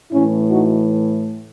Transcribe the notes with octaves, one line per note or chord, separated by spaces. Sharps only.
A2 E3 C#4 E4
D#4 F#4